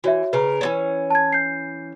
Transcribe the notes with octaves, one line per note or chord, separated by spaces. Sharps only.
E3 F#4 C#5 E5
C#3 A#4 B4
E3 B3 C#4
A5 G#6
G6 C7